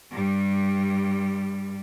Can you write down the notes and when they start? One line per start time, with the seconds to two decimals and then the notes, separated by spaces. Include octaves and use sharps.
0.12 G2 G3